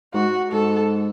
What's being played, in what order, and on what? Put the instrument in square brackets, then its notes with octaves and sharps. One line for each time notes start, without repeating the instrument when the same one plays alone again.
[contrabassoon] G#2 [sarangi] F#4
[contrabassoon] G#2 [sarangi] A4